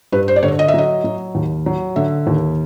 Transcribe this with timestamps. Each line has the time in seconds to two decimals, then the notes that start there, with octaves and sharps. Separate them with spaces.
0.12 G2 B4
0.28 C5
0.36 D5
0.43 D3 C#5
0.59 D#5
0.68 E5
0.74 F#3 D#5
1.04 F#3
1.35 D#2
1.66 F#3
1.96 D3 E5
2.27 D#2